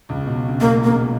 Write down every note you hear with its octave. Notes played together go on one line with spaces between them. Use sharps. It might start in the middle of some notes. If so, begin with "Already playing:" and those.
C#2 C#3
B1 B2
C#3
B1 B2 A#3
A#2
A#3
C#3
B2